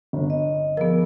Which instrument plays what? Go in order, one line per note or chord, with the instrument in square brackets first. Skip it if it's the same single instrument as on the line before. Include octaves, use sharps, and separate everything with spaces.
[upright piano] G1
[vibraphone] D#5
[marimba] F3 B3 [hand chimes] G#4 A#4